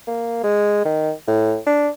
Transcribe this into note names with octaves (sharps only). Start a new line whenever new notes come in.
A#3
G#3
D#3
A2
D4